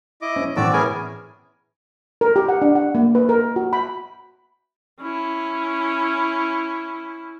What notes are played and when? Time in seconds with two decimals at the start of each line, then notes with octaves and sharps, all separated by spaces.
0.22 E4 D#5 D6
0.36 C#4
0.56 A2 E3 C4 F#4 D5 D6 E6
0.73 B3 C#4 E4 G#4 A#4 G#5
2.21 A#4
2.36 G4
2.49 F#5
2.62 D4
2.75 F#5
2.95 A#3
3.15 B4
3.29 A#4
3.56 F#4
3.73 B5
5.00 C#4 E4